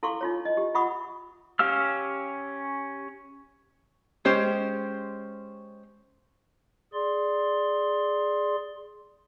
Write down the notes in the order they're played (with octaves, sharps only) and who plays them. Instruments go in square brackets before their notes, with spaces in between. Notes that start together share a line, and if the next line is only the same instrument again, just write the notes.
[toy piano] E4 A4 F5 C6 C#6
D#4 F4 C#5
D#5
G4
F4 E5 F#5 B5 C#6 D#6
[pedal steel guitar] C#4 G4 F5 E6 F6
[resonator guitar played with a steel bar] G#3 C#4 G4 C5
[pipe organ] G#4 D5 C6